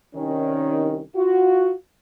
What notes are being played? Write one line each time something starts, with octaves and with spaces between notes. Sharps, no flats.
C2 D#3 C#4
F4 F#4